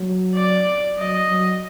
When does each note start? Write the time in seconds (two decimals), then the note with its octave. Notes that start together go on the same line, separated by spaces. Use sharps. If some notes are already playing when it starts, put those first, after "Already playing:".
Already playing: F#3
0.34 D5
0.98 F#3 D#5
1.30 F#3